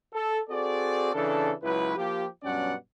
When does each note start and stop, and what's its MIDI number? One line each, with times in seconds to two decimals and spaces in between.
0.13 0.39 69
0.50 1.12 60
0.50 1.12 66
0.50 1.12 68
0.50 1.12 69
0.50 1.12 74
1.13 1.53 49
1.13 1.53 52
1.13 1.53 62
1.13 1.53 69
1.63 1.94 37
1.63 1.94 54
1.63 1.94 64
1.63 1.94 71
1.96 2.25 53
1.96 2.25 58
1.96 2.25 65
1.96 2.25 67
2.44 2.74 43
2.44 2.74 47
2.44 2.74 54
2.44 2.74 61
2.44 2.74 74
2.44 2.74 78